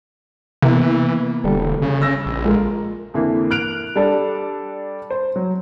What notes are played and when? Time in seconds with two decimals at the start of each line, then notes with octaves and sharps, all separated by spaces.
0.62 C3 E3 A#3 B3
1.44 E1 D3 G3 A4
1.82 C#3
2.01 E6 A#6
2.26 A#1
2.45 G#3 F4 A#4
3.14 F2 D3 E3 A#3
3.51 F6 F#6 D7 F7
3.96 G3 D4 A4 D5
5.10 C5
5.36 F#3